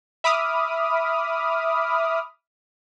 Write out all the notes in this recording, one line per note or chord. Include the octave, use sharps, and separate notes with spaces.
E5 B5 D6 D#6 F6